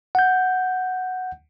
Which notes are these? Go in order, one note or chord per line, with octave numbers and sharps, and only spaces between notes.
F#5 G6